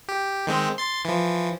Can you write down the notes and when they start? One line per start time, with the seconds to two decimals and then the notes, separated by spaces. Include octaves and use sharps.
0.08 G4
0.47 D#3 G#3 C4
0.78 C6 A6
1.05 E3 F3